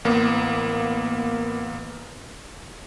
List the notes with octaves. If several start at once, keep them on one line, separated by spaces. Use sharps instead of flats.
A1 A#3 B3